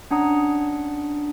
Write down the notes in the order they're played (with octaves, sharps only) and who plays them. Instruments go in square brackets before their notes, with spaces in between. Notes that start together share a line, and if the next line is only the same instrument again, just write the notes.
[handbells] C#4 D4 F#5 A#5 D#6